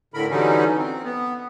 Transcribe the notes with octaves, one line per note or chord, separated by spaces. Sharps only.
A2 D3 A#4 B5
D3 E3 F#3 G3 C#4 D#4
C4
B3